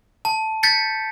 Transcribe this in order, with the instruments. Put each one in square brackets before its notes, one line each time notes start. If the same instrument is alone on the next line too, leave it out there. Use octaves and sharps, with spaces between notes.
[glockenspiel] A5
G6 A6 B6 C#7